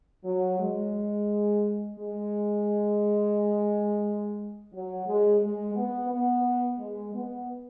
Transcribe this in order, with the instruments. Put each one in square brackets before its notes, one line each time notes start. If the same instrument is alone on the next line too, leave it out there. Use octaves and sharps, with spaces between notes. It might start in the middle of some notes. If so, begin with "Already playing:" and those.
[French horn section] F#3
G#3
G#3
F#3
G#3
G#3
B3
B3
G#3
B3